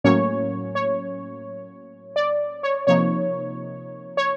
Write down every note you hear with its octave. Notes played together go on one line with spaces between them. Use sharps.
A2 F#3 A#3 C#4 C#5
C#5
D5
C#5
C3 F3 A#3 D#4 C#5
C#5